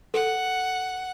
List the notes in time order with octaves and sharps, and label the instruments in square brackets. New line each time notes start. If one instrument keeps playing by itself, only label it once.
[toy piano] A4 [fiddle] F#5